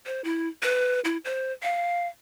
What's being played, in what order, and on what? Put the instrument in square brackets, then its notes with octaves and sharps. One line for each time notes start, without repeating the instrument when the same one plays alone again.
[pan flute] C5
E4
B4
E4
C5
F5